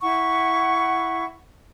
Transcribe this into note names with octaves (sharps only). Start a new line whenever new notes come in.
E4 F#5 C#6